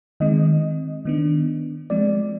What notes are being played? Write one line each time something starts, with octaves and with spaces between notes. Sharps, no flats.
D#3 G#3 C4 D#5
D#3 B3 D4
F3 G#3 C4 D5